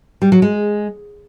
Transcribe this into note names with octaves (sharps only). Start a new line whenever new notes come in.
G3
F#3
G#3